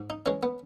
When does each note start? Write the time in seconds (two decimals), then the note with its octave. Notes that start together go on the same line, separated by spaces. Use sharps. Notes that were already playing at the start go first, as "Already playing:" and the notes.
Already playing: G#2
0.10 D#4
0.26 E3 G#3 C#4
0.43 B3